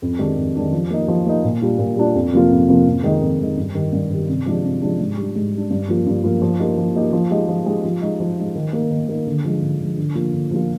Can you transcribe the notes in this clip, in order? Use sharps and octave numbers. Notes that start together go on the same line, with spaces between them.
F2
D#3 G#3 D4 G4
F2
D#3 G#3 D4 G4
F3
A#3 D#4
F3
A#3 D#4
A#2
G3 D4 F4
A#2
G3 D4 F4
F2
C3 F3 A#3 F4
F2
C3 F3 A#3 F4
F2
D#3 G#3 D#4
F2
D#3 G#3 D#4
G2
D#3 G3
G2
D#3 G3
C3
F3 G#3 D4 G4
C3
F3 G#3 D4 G4
G#2
G3 D4
G#2
G3 D4
G2
F3 A#3 F4
G2
F3 A#3 F4
F3
A#3 D#4 G4
F3
A#3 D#4 G4
F3
G#3 D#4 G4
F3
G#3 D#4 G4
F3
G#3 D#4
F3
G#3 D#4
D#3
A#3 D#4
D#3
A#3 D#4
D3
F3 G#3
D3
F3 G#3
D3
F3 A#3 F4
D3
F3 A#3 F4